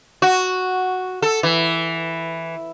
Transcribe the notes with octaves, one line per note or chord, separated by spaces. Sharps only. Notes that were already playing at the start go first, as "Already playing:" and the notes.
F#4
A4
E3